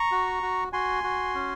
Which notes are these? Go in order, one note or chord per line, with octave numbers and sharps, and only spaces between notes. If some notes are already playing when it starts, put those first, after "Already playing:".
Already playing: A#5 C#6
F#4
F#4
F#4 G#5 C6
F#4
C#4